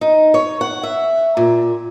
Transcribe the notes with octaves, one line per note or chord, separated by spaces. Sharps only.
D#4
C#5
F#5
E5
A#2